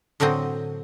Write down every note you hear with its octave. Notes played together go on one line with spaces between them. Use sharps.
A2 D3 F#3 C4 D#5